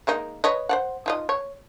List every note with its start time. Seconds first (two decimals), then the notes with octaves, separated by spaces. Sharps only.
0.07 G#3 A#3 D#4
0.44 B4 C#5 D#5
0.69 C5 D5 F#5
1.06 D#4 F4 D#5
1.29 C#5